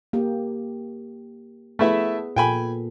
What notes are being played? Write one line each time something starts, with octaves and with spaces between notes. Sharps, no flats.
A#3 G4
A3 B3 E4 G#4 B4 E5
A#2 A4 G5 G#5 B5